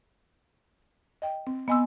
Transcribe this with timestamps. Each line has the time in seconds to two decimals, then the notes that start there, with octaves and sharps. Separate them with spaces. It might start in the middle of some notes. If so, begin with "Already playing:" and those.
1.22 D#5 G5
1.47 C4
1.68 B3 D#5 G#5 C6 E6